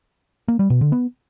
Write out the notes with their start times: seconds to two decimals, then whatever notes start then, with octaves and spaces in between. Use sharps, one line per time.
0.48 A#3
0.59 G3
0.70 B2
0.81 D3
0.92 B3